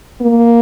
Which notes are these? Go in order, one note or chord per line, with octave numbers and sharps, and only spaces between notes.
A#3